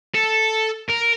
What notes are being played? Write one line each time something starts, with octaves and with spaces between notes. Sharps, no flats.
A4
A#4